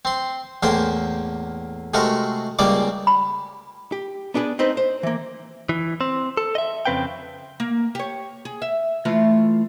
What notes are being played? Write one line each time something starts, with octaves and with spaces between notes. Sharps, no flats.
C4 C6
E2 A2 A#3 C5 G5
C3 G#3 A3 F#4 A#4
C#2 C#3 G3 A#3 D5 D6
B5
G4
B3 D4 G#4 A4 B4
C4 D#4 B4 C5
C5
E3 A#3
E3
C4
A4
D#5 E5
F2 C#3 C4 B4 F5 G5
A#3
G4 C#5
G#4
E5
E3 A3 F4